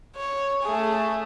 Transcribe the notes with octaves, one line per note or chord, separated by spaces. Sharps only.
C#5
A3 G#4